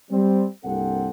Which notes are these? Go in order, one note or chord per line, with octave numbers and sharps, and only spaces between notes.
G3 C4
C2 G2 A#3 C4 A4 F#5